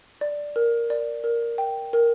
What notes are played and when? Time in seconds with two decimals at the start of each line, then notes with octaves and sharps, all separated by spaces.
0.21 D5
0.56 A#4
0.90 D5
1.24 A#4
1.58 G5
1.93 A#4